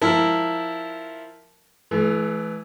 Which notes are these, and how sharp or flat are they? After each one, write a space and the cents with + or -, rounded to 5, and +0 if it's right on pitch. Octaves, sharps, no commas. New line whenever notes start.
F3 +0 E4 +0 A#4 -10
E3 +0 A3 -45